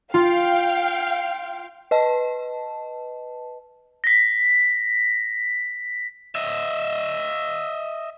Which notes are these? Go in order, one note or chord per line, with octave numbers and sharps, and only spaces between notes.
F4 F5 G5
B4 D#5 A5
A#6 B6
D#5 E5